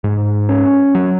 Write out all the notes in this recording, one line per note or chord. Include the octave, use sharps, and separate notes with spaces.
G#2
C#4
F#3